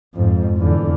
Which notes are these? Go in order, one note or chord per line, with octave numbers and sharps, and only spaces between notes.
F2 G#2
E2 D3